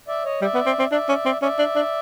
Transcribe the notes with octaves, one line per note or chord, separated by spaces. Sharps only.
D5 E5
C#5 D#5
G3 D5 E5
B3
C4
C4
D4 D5 E5
C#4
C4
C#4 D5 E5
D4
D4